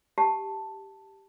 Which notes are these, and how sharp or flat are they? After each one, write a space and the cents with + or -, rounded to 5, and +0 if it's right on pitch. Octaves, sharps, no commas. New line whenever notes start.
G4 +0 A5 +5